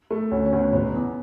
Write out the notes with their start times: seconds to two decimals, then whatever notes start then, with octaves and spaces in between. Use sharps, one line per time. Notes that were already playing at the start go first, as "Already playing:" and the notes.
0.11 A3
0.31 D2 C#4
0.46 C#4
0.53 D2
0.59 B3
0.73 E1 B3
0.94 E2